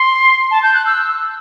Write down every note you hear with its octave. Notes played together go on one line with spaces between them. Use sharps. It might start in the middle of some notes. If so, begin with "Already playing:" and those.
Already playing: C6
A5
G6
F#6
E6